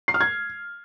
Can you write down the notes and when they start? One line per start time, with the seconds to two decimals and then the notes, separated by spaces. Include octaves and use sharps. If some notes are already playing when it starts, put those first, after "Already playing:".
0.08 C7
0.14 F6
0.21 G#6